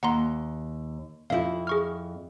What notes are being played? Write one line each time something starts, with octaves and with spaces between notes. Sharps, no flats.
D#2 F#5 A#5 C6
F2 E4 F4 E5 F5
G#4 C#6 F6